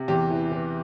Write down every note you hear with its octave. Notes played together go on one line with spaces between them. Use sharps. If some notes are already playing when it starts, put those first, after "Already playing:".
Already playing: C3
E2 G4
E3
E3